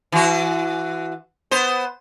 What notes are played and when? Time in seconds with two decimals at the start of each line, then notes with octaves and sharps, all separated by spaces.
0.12 E3 F#4
1.51 B3 C5